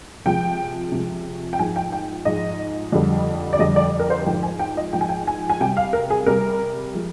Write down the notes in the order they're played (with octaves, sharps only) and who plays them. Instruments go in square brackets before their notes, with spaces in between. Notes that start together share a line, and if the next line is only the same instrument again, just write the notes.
[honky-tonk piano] C3 F3 G#3 G5
C3 F3 G#3
G5
G#2 F3 G#3 G#5
G5
G5
G#2 F3 G#3 D#5
F2 D3 G3
D5
F2 D3 G3 D#5
D5
A#4
C5
G#2 F3 G#3 G5
G#5
G5
D#5
G#2 F3 G#3 G5
G#5
G5
G#5
G#5
C3 G3 G5
F5
A#4
G#4
C3 G3 A#4
F3 G#3